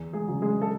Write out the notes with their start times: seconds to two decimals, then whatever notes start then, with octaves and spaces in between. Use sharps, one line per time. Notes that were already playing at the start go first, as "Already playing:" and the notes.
Already playing: E2
0.13 G#3 G#4
0.28 C#3 F#3
0.42 G#3 G#4
0.62 A4